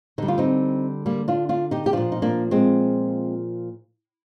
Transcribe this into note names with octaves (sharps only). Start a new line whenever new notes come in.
D3 G3 D#4
F4
C4 D#4
G3 A#3
D4 F4
D4 F4
D#4 G4
G4
A#2 F3 D4 F4
D#4
A#3 D4
G#3 C4